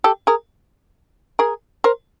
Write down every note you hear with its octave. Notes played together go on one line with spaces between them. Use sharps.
G4 A4
G#4 A#4
G#4 A#4
A#4 C5